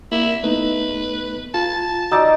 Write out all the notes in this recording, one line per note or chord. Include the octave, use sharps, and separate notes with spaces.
A#3 E4
A3 B3 D#4 B4
F4 A5
D#4 F#4 D5 D#5 E6 A6